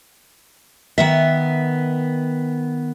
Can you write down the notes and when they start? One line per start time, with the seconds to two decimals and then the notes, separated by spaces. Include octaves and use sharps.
0.98 D#3 B3 E5